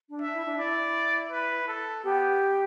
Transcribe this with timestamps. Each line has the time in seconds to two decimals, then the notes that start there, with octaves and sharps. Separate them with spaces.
0.10 D4
0.22 E5
0.34 E4
0.45 D4
0.57 E4 D5
1.32 B4
1.68 A4
2.04 B3 G4